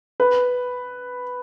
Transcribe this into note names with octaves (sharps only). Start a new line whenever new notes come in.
B4